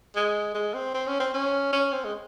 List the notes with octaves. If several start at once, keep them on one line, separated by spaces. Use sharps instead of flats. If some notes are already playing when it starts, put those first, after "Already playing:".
G#3
G#3
C4
C4
C#4
C4
C#4
C#4
C4
G#3